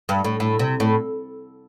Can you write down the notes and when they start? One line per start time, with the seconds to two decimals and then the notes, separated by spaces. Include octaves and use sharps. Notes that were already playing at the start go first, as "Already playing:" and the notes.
0.09 G2
0.25 A2
0.40 A2
0.59 C3
0.80 A2